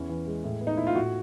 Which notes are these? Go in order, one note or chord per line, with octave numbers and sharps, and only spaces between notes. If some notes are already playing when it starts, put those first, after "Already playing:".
Already playing: E2 C#4
E3
G#3
A2
B3
D#4
A2 E4
F4
A2 F#4